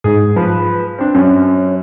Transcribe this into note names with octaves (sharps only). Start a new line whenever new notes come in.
G#2 G#4
F3 B4
C4 D4
F#2 C#4